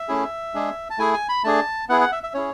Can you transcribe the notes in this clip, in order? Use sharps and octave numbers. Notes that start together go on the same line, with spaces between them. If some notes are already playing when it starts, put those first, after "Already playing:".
Already playing: E5
A3 C#4 E4 G#4
G#3 D4 G#4
A5
A3 E4 G#4 G#5
G#5
B5
A3 D4 G#4 A5
B3 E4 G#4 F#5
F#5
E5
E5
C#4 E4 G#4 C#5